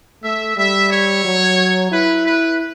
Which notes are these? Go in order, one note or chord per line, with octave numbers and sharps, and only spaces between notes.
A3 E5
G3 E5
C#5
F#3
E4 B4
B4